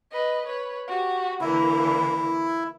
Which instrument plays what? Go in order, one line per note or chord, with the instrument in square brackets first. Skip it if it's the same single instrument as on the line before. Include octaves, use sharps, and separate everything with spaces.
[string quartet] B4 D#5
B4 C#5
F#4 G4
[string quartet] D3 E3 A#3 [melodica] E4